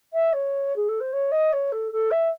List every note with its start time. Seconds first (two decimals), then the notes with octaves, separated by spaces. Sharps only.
0.13 E5
0.33 C#5
0.76 G#4
0.88 A4
1.00 C5
1.13 C#5
1.31 D#5
1.52 C#5
1.72 A4
1.92 A4
2.11 E5